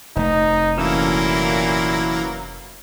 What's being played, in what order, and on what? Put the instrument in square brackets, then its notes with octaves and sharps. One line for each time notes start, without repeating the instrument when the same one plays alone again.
[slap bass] F1 A3 [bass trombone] D#4
[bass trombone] A#2 [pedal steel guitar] E3 C#4 A4 [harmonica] F#3 A#3 E4